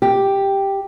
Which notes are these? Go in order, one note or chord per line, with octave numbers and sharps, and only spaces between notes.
G4